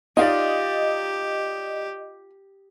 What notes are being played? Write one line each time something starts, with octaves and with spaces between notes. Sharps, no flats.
D#4 F4 G4 D5 D#5 F5